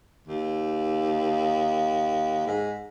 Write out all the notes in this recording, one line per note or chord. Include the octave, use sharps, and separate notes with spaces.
D#2
G#2